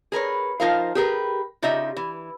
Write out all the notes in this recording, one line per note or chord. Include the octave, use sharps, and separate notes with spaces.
G#4 A#4 B4 C#5
F3 D#4 F4 A#4 C5 F5
G4 G#4 A#4 B4
C#3 D#4 F4 G4 D#5 E5
E3